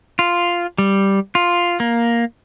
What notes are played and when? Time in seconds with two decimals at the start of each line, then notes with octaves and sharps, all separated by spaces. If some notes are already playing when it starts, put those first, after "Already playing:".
0.19 F4
0.78 G3
1.35 F4
1.80 A#3